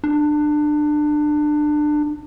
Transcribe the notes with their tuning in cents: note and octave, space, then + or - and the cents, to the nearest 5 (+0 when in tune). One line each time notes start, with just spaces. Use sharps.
D4 +25